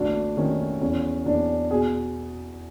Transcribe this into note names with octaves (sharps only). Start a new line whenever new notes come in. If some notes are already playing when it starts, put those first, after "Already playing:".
Already playing: A1 D2 D4
D#3 C#4
E2 C#4
E2 D4
B2 G#4